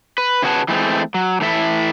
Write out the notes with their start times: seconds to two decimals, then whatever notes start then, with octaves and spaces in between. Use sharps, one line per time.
0.18 B4
0.42 C#3 E4 F#4 G#4 B4 A5
0.68 E3 G#3 A3 C4
1.14 F#3
1.41 A2 E3 E4 A4 E5